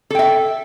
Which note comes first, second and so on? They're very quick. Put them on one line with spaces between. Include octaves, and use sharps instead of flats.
A4 G5 E5